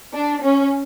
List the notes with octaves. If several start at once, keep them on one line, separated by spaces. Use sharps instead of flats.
D4
C#4